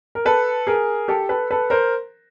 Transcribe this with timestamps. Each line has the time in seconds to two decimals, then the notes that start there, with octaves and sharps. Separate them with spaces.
0.15 A#4
0.25 A4 B4
0.67 G#4 A#4
1.08 G4 A4
1.29 A4 B4
1.51 A4 B4
1.70 A#4 C5